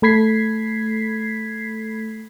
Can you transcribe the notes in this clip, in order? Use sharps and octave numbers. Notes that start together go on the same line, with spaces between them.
A3 A4 B5 G#6 B6 C7